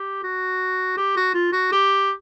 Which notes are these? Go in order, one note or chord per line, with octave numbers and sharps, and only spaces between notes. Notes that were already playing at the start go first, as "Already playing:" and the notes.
Already playing: G4
F#4
G4
F#4
F4
F#4
G4